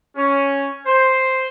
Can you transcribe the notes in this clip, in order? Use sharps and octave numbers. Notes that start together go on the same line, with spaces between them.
C#4
C5